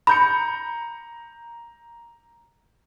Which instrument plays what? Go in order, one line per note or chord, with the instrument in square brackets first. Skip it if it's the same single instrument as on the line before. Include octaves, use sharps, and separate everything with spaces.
[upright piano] A#5 G6 C#7 [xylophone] B5